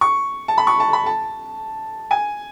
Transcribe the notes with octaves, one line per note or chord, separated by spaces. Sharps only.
C#6
A5
B5
C#6
A5
B5
A5
G#5